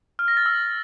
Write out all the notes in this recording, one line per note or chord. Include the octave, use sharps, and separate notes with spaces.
F6
A#6
A6
E6